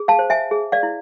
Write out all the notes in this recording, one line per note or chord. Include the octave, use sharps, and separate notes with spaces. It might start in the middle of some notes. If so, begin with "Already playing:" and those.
Already playing: G#4
F5 A5
C5
E5 G#5
G#4
D5 F5
E4